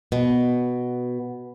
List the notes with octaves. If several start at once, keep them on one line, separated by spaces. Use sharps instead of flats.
B2